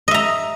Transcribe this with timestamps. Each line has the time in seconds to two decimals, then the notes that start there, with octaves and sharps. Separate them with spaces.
0.08 D#5
0.11 E5
0.14 A#5